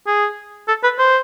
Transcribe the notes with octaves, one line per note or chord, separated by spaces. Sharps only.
G#4
A4
B4
C5